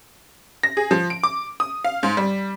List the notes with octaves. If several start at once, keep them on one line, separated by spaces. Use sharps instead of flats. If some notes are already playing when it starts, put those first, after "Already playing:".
A#6
G#4
F3
D7
D6
D#6
F5
G#2
G3